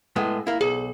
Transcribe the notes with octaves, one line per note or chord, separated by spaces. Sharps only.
A2 G#3 B3
A#3 E4
B1 G#4